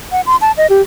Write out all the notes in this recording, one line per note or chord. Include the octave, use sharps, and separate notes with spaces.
F#5
C6
A5
D#5
G4